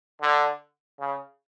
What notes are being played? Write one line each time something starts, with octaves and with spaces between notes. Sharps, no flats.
D3
C#3